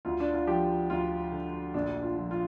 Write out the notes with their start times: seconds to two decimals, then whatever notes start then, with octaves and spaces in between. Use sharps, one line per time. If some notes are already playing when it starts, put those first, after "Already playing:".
0.05 D2 F4
0.20 D4
0.34 F4
0.47 F3 G4
0.90 D2 F4
1.32 D3
1.74 A#1 D4
2.03 F4
2.16 F3
2.31 F4